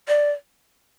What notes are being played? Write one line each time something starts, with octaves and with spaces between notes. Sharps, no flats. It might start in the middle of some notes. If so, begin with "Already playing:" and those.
D5